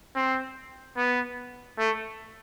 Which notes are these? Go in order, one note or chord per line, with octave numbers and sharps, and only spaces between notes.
C4
B3
A3